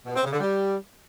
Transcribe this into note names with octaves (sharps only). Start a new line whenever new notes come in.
B2
C4
C#3
D3
G3